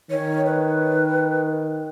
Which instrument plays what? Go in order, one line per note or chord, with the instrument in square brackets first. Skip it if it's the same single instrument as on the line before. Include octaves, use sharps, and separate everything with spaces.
[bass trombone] D#3 [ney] C#5
[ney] B4